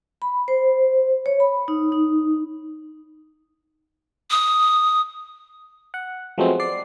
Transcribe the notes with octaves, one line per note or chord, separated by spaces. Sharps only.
B5
C5
C#5
B5
D#4
D#4
D#6
F#5
F3 F#3 G#3 A3 B3 C4
D5 C7